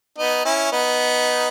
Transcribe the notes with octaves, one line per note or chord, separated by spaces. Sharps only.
B3 D#4
C#4 E4
B3 D#4